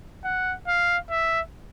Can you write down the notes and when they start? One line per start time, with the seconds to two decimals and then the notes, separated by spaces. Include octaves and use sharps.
0.24 F#5
0.67 F5
1.10 E5